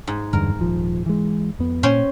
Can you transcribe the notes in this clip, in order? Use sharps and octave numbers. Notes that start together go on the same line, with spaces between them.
G#2
E2 G2 D3 A#4
D#1 F3
E3 G#3
F2 B3
A#2 C#4 C5 G5